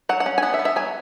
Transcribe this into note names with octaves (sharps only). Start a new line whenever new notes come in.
F#3 F#5
F#5
C#4
G#5
B3 F#5
E5
B3
E5
F#3 G#5